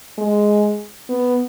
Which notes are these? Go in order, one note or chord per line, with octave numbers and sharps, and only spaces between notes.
G#3
B3